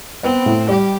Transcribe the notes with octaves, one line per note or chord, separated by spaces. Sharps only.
B3 C4
A2
G3 G4